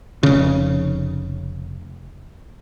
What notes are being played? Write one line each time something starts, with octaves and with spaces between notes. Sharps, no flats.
F1 C#3